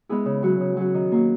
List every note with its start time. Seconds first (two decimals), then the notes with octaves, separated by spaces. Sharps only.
0.09 G#3 B3 E4 G#4
0.26 C#3
0.43 F#3 C#4 F#4
0.60 C#3
0.77 F#3 C#4 F#4
0.94 D#3
1.12 F#3 A#3